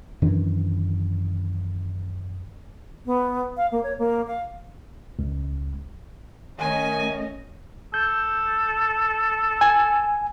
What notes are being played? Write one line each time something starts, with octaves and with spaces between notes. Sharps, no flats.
F#2 D#3 E3 D4
B3
F5
A#3
C#5
A#3
F5
C#2
D#3 A3 C#4 D#5 G#5
A4 G6
G#5